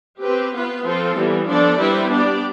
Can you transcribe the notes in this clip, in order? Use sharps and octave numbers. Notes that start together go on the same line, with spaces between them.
C4 G4 B4
B3 F4 B4
F3 C4 F4 A4
E3 G3 B3
F3 B3 D4 A4 D5
G3 C4 E4 B4
B3 D4 G4 D5